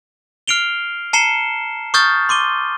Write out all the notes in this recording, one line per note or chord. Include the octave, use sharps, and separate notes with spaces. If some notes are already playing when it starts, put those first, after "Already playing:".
F6 C7 D7 F7 G7
A5 A#5 C7 C#7 E7 G7
C#6 D#6 F6 G6 A6
C6 D6 D#7 G7